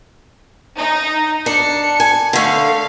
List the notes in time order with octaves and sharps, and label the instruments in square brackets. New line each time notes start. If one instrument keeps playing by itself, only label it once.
[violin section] D#4
[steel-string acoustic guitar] D4 [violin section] C#7
[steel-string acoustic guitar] G#5
[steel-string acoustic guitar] D3 A3 [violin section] F5